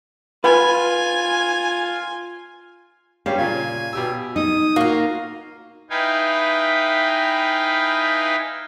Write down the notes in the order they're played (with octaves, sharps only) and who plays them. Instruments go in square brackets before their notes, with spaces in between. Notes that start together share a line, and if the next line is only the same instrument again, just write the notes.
[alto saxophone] F4 [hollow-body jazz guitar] B4 [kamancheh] G#5
[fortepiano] G2 G3 C#4 [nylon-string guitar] F5
[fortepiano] A#2 C#3 F4 [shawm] G#5
[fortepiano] B2 G4 E6
[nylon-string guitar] D#4 [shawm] D#6
[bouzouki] A#3 F4 [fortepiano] F#4
[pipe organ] D#4 E4 B4 F5 G5 G#5